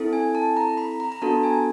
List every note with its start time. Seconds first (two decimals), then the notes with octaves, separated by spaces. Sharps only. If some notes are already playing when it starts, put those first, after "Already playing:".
Already playing: C4 E4 A4
0.13 G#5
0.35 A5
0.57 A#5
0.77 B5
1.00 A#5
1.12 A#5
1.22 B3 D4 F#4 A4 A5
1.43 G#5